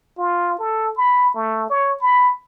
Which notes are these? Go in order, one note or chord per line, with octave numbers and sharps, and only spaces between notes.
F4
A4
B5
A3
C#5
B5